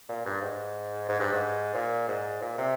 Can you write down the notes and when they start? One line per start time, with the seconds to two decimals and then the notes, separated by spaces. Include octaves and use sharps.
0.08 A#2
0.25 G2
0.42 G#2
1.09 G#2
1.20 G2
1.32 G#2
1.75 A#2
2.08 G#2
2.41 A#2
2.58 C3